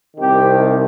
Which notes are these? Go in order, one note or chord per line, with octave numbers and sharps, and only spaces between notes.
C2 C3 D#3 G4